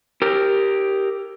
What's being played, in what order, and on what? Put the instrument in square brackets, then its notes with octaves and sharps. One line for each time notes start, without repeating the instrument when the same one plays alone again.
[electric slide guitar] G4 A#4